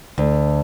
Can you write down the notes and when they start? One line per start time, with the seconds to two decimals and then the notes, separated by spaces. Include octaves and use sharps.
0.18 D2